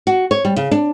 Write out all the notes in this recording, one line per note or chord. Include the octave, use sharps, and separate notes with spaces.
F#4
C#5
G3
C#3
D4